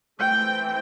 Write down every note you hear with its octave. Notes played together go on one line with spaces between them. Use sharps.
E3 A3 C4 G5